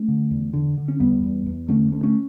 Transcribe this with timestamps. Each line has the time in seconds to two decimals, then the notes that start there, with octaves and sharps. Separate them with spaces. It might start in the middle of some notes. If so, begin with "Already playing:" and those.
Already playing: A3 C#4
0.08 D3
0.31 E2
0.53 D3
0.78 D3
0.88 C#4
1.00 E2 G3 B3
1.23 E2
1.46 E2
1.68 D3 A3 C#4
1.92 D2
2.03 A3 C#4